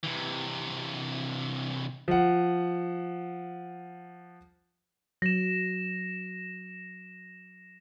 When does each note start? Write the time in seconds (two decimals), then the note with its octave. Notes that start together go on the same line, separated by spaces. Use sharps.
0.04 C3 E3
2.08 F3 F#5
5.22 F#3 A#6 E7